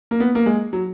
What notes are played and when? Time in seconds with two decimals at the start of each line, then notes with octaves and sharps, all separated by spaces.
0.11 A#3
0.20 B3
0.35 A#3
0.46 G#3
0.73 F#3